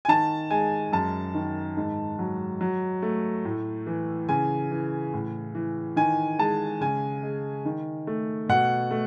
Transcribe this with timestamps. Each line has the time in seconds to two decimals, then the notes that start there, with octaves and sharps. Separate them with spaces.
0.05 G#5
0.08 D#3 A5
0.50 G#3 G#5
0.92 F#2 A5
1.34 D#3
1.77 G#2
2.19 F#3
2.61 F#3
3.02 A3
3.45 A2
3.87 E3
4.29 C#3 G#5
4.71 E3
5.13 A2
5.55 E3
5.96 D#3 G#5
6.39 G#3 A5
6.81 C#3 G#5
7.23 G#3
7.65 D#3
8.07 A3
8.49 B2 F#5
8.91 A3